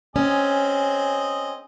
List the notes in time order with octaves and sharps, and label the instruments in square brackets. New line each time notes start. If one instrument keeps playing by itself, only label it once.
[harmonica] C4 G#4 D#5 [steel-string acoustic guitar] C#4